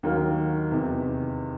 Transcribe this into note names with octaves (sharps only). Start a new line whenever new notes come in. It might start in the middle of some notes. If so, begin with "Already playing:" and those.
D#2 D#3 F#3 A#3
E2 C3 D#3